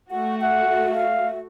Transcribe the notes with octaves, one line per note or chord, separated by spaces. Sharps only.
A3 F#4 F#5
E5 F#5
F5